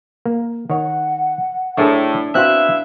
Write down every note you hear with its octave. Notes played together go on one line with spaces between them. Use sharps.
A#3
D#3 C#5 F#5
A2 D4 G#4 A#4 E5
B2 C4 E4 F#4 C5 E5 F5 F#6